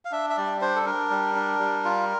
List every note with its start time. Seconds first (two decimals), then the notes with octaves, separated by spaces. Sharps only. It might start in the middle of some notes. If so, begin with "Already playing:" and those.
0.05 F5
0.12 D4 E5
0.30 E5
0.37 G3 D5
0.61 D4 C5
0.76 A4
0.86 D4 A#4
1.10 G3
1.35 D4
1.59 G3
1.85 F4